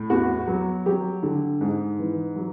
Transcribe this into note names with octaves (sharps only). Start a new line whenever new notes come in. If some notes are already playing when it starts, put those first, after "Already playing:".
Already playing: A2
E2 F#4
F#3
F#3 G4
D3
G#2 G#4
E3
F#3